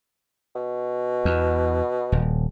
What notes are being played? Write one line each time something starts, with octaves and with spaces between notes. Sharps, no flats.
B2
E2
D#1